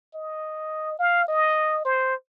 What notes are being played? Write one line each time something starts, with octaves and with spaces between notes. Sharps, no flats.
D#5
F5
D#5
C5